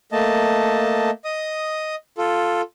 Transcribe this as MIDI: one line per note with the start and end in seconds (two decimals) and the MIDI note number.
0.12 1.10 57
0.12 1.10 58
0.12 1.10 75
0.12 1.10 81
1.25 1.95 75
1.25 1.95 87
2.18 2.62 65
2.18 2.62 69